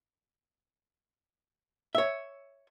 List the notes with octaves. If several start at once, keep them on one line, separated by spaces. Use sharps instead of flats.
C#5 E5